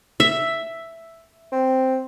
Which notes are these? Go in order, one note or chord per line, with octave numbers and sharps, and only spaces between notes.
E5
C4